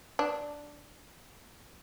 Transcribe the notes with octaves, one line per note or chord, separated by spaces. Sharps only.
D4